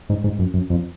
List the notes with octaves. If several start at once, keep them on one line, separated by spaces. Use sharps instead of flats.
G#2
G#2
F#2
F#2
F2